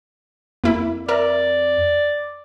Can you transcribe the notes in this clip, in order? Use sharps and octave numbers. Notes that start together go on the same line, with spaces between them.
F2 A#3 E4
A#4 D5 E5